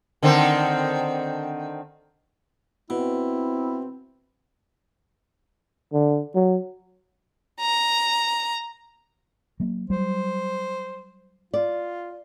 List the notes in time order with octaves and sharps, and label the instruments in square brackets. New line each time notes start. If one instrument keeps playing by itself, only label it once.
[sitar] D3 D#3 C4
[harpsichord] B2 [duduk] C4 [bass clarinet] E4
[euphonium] D3
F#3
[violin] A#5
[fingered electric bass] F#3 A#3
[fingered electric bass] F#3 G3 [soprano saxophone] C5
[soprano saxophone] F4 [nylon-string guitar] D5